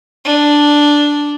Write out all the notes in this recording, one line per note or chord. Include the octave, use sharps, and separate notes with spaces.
D4